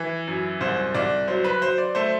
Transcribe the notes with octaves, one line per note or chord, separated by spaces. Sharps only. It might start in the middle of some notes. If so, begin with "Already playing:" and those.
Already playing: E3
F#2
C2 C5
C2 D5
F#3 C5
B4
F#3 C5
D5
A3 C5